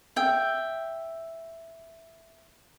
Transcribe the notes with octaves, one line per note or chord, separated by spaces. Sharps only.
E5 G5